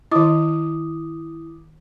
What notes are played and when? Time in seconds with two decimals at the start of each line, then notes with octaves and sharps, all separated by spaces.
0.12 D#3 E4 D#5 D6 D#6